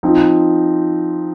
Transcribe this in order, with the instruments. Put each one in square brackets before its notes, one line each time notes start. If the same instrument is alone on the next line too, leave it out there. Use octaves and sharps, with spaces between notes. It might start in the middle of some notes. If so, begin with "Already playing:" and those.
[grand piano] F3 C4 D#4